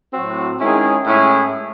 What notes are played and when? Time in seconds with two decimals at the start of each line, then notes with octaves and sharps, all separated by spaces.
0.13 A2 F#3 C4 F#4
0.59 D#3 G#3 C#4 E4 G#4
1.05 A2 G#3 C#4 E4 G#4